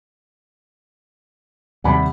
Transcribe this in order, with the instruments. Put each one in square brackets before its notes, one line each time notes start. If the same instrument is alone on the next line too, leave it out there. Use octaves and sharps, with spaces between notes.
[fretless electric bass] D#2 C3 G3 [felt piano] F#5 G#5 B5